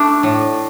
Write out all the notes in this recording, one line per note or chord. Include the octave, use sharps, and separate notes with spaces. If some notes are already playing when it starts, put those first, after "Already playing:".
Already playing: A3 D4
A2